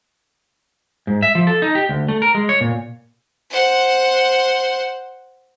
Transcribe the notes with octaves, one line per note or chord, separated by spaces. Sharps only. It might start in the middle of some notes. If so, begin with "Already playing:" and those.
G#2
E5
F3
A4
D#4
G4
D2
A3
A#4
G#3
C#5
A#2
C5 F#5